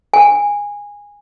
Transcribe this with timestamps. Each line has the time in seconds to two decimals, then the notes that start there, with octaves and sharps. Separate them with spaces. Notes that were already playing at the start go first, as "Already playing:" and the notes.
0.14 G#5